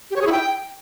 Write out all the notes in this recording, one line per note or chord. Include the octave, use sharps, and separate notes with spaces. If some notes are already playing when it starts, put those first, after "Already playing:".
G4
C#5
G#4
E4
G5